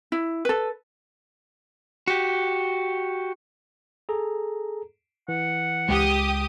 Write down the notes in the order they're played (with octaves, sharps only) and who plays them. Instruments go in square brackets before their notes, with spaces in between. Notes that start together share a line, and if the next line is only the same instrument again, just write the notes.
[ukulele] E4
A4 B4
[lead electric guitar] F#4 G4
[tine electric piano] G#4 A4 A#5
[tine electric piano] E3 [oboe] F#5
[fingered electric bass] C#2 G#3 [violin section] G4 D#6